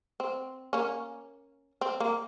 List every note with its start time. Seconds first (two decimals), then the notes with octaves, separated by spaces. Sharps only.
0.20 C4
0.73 A#3 C#4
1.81 C4
2.00 A#3